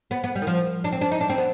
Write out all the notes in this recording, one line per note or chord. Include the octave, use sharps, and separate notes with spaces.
B3
B3
G3
D#3
F3
D4
C4
D4
D#4
D4
C4
B3